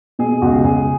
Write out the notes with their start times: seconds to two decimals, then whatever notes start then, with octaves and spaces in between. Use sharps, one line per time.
0.19 B2 G#4
0.42 C#2 F#4
0.64 C#2 G#4